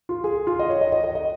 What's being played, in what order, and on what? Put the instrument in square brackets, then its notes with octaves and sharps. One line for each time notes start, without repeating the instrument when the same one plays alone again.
[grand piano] F4
G#4
F4
D#5
C#5
D#5
D#5
D#5
D#5